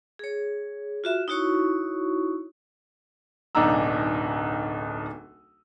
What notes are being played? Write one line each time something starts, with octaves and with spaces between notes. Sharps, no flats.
G#4 C#5
F4 F#4 E5
D#4 E4 F#4 C#5 C#6
D1 B1 D4 D#4 A#5 E6